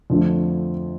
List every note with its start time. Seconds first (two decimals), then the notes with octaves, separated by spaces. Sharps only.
0.10 F2 D3 F3 A3